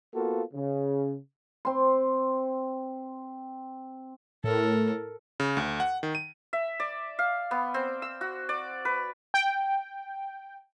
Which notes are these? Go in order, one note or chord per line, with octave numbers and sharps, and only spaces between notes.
A#3 B3 F4 F#4 A4
C#3
C4 C6
A2 A4 A#4
C#3
D2
F#5
D#3
D#7
E5
D5
F5
B3
C4
E6
F#4
D5
B4
G5